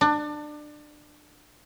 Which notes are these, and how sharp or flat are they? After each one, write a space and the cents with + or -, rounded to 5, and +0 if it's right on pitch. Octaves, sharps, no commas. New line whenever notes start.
D4 +25